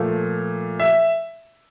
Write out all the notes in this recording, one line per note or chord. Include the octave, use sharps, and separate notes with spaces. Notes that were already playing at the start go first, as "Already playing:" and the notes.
Already playing: A#2 F3 A3
E5